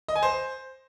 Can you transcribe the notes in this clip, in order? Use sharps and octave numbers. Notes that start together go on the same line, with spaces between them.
D#5
G#5
C5